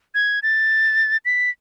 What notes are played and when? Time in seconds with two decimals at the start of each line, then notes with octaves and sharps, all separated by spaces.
0.15 G#6
0.43 A6
1.25 B6